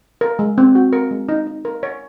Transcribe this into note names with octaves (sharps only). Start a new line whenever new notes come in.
A#4
G#3
C4
F#4
A#4
G#3
D#4
D#4
A#4
C#5